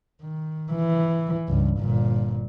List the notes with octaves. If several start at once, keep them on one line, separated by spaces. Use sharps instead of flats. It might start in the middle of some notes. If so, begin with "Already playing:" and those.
D#3
E3
C#2 G2
G1 A#2